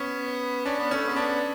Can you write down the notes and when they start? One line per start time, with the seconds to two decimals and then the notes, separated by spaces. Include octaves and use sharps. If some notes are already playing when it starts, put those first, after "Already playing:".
Already playing: B3 C#4
0.65 C#4 D4
0.79 B3
0.91 A3 C#4
1.07 G#3 B3
1.16 D4